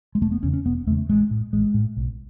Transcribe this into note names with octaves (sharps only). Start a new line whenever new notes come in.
G#3
E1 A3
B3
E2 C#3 C#4
C#4
E1 B3
E2 C#3 A3
A1 G#3
A2
A1 G#3
A2
B1